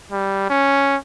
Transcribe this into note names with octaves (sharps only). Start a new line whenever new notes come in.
G3
C#4